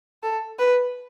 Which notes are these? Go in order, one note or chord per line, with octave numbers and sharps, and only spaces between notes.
A4
B4